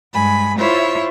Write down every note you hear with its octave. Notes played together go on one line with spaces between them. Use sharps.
G2 G#3 G#5 B5
E4 F4 C5 C#5 E5